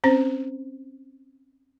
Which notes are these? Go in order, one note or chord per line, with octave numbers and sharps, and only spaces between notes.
C4 C#4 C5